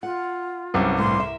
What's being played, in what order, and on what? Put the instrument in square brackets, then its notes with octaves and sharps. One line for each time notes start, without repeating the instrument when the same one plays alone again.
[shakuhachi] F4 [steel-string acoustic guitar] F#5
[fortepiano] C2 G2 [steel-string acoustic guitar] F#3 C#4
[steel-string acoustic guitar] A2 [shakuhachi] C6
[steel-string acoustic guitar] A#4 E5